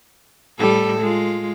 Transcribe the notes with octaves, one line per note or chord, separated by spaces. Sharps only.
A2 G3 A4
G#3 F4